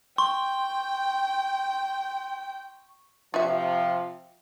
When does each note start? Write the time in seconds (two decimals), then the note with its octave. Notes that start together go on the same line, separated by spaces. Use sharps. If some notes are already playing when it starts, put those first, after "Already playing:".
0.18 G5 C6 C#6
3.34 C3 F3 F4 F#4 E5